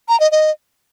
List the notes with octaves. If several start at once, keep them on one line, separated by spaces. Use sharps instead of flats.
A#5
D#5
D#5